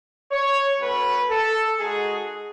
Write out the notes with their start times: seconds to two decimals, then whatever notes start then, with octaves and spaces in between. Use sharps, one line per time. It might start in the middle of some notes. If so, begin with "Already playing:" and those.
0.31 C#5
0.80 A3 C#4 F#4 B4
1.29 A4
1.79 G#3 D#4 F#4 G#4